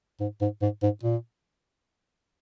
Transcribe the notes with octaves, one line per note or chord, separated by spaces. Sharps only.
G#2
G#2
G#2
G#2
A#2